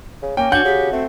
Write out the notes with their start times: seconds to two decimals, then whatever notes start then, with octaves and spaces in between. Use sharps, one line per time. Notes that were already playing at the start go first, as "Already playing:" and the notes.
0.23 C#3
0.37 A#3 C#4 G5
0.52 D4 F#4 F#5 G6
0.65 C#3 G4
0.93 A3 C4